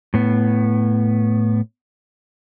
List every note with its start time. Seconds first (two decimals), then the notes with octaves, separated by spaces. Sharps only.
0.14 A2 B3